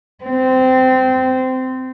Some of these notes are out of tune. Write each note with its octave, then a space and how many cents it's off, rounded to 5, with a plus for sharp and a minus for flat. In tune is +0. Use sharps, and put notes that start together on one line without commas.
C4 -20